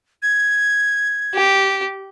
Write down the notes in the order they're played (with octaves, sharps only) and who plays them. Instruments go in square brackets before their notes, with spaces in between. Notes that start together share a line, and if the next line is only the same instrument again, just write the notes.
[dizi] G#6
[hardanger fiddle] G4